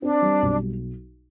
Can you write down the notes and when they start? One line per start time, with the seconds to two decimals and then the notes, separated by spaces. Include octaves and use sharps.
0.02 C4 D4
0.22 G3
0.42 B1